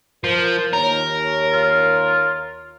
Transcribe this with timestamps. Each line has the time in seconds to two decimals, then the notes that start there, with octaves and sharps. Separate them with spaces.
0.24 F3 A#4
0.73 D#2 A#4 C#5
1.52 F4